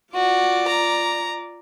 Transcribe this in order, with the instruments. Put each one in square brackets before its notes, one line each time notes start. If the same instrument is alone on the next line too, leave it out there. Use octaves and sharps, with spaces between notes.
[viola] F4 D5 [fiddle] F#4
[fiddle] A#5